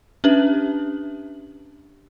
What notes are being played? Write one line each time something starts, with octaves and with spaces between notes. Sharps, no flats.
C#4 D4 G4 B4 E5 F#7